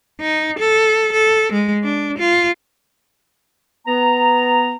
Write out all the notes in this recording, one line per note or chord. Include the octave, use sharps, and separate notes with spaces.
D#4
A4
A4
G#3
D4
F4
B3 A#5